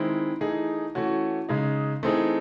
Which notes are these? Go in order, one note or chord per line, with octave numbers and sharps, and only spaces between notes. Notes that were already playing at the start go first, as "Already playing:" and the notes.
Already playing: D#3 G#3 C4 E4
E3 A3 D#4 G#4
E3 A3 C#4 F#4
C#3 G#3 D#4
E3 A3 C4 D#4 G#4